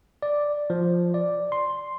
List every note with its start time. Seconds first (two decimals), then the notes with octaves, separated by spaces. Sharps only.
0.22 D5
0.70 F3
1.14 D5
1.52 C6